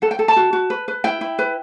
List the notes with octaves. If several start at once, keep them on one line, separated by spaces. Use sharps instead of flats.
A4 F#5
G5
A4
A5
F#4
F#4
B4
B4
E4 G5
E4
B4